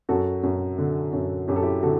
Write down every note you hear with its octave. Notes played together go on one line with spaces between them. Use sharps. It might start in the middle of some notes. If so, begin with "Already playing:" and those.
F#2 F#4 A4
F#2
D3
F#2
F#2 G4
A4
E4 G4
D3 F#4 A4